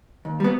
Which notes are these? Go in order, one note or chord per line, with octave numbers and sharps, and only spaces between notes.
D#2
G3 B3